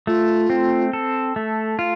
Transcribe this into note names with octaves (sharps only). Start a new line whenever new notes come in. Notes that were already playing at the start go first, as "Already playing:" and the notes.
A3 F4
C4
A4
A3
F4